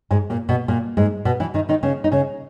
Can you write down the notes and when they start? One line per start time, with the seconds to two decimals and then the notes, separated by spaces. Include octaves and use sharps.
0.11 G#2 G#3
0.30 A#2 A#3
0.49 B2 B3
0.68 A#2 A#3
0.97 G#2 G#3
1.25 B2 B3
1.40 E3 E4
1.54 D#3 D#4
1.69 D#3 D#4
1.83 C#3 C#4
2.04 D#4
2.12 C#3 C#4